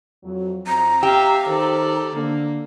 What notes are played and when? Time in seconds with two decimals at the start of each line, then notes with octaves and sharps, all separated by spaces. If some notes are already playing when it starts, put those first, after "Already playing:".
0.24 F2 F#3
0.67 F2 C4 A#5
1.03 G4 E5 F5
1.47 D#3 A4 C5 D5
2.13 D3 A#3